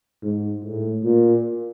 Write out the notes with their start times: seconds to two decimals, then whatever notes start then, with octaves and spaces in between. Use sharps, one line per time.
0.23 G#2
0.63 A2
1.04 A#2